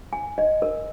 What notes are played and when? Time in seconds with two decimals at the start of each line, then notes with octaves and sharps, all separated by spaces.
0.13 G#5
0.38 D#5
0.62 A#4